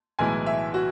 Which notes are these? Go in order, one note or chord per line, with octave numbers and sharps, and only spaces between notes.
B1 A2 E3 G#3 G#5
E5
F#4